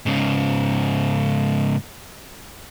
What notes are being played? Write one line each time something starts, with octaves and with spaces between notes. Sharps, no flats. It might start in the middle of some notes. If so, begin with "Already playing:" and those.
G#2 C#3